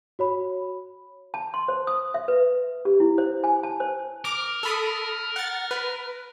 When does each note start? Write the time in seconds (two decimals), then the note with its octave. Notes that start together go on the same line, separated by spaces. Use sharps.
0.19 F#4 C#5 B5
1.34 A5
1.54 C6
1.68 C5
1.87 D#6
2.14 E5
2.28 B4
2.85 G4
3.00 E4
3.18 C5
3.44 G#5
3.63 A5
3.80 C5
4.25 A#4 D6
4.63 A4 B5 D#6
5.36 F#5 A6
5.71 B4